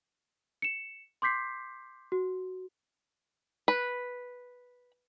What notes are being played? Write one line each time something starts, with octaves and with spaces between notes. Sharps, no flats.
C#7 E7
C6 D6 G6 B6 C7
F#4
B4